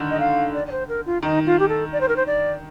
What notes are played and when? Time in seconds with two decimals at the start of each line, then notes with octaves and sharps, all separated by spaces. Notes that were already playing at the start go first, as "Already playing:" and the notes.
Already playing: D3 D#3
0.10 D#5
0.20 F5
0.54 D5
0.67 D5
0.72 C5
0.89 A#4
1.06 F4
1.23 D#3 D#4
1.46 F4
1.59 G4
1.68 A4
1.92 D5
2.00 C5
2.08 A#4
2.16 C5
2.27 D5